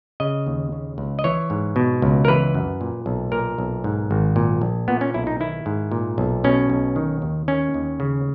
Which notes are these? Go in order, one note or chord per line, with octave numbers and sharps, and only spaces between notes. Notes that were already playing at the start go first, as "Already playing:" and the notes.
C#3 D#5
D#2
C#3
C#2
D#5
E3 C#5
G#2
B2
C#2
A#4
E3 B4
F#2
A#2
B1
A#2 A#4
B1
G#2
G#1
A#2
A#1
A#2 B3
C#4
B1 E4
D#4
D#3 E4
G#2
A#2
B1
B2 C#4
B1
D#3
D#2
D#3 C#4
D#2
C#3